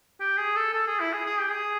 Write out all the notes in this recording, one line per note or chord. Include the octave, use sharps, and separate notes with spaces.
G4
G#4
A4
A4
G#4
E4
G#4
G#4
G4
G#4